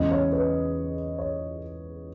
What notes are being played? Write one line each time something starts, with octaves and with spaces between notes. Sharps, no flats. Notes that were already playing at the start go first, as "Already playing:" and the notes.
Already playing: E2 C#3 G#3 D#5
C#5
B4
C#5